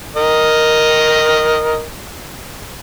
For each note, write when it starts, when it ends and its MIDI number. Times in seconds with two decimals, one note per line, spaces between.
0.16 1.82 70
0.16 1.82 75